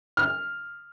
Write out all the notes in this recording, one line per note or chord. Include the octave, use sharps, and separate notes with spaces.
F6